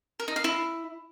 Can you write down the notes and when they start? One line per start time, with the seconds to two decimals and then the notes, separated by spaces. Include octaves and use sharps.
0.20 A#4
0.28 D#4
0.36 F5
0.44 E4